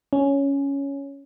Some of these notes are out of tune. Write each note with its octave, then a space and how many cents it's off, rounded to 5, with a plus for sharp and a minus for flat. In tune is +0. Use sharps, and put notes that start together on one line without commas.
C#4 +5